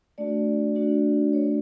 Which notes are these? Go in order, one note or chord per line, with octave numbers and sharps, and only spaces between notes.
A3 D4 F#4 D5
A3 D4 F#4
A3 D4 F#4 C#5